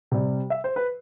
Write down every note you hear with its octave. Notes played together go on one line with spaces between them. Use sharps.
C3 G3
E5
C5
B4